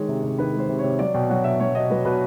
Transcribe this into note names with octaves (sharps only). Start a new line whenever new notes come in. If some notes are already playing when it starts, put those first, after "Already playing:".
Already playing: D#3 G#3 C#5
C3
C3
D#3 B4
G#3
C5
C3
C3 C#5
F#3 D5
B2 G5
F#3 F#5
B2 E5
F#3 C#5
B2 D#5
F#3 B4
B2 B4